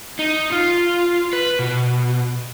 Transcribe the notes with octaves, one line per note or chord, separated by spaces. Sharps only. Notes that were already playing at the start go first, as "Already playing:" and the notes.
D#4
F4
B4
B2